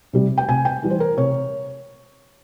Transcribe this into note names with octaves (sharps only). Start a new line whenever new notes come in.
C3 G3
G5
C3 G#5
G5
E3 G3
C5
A#4
C3 C#5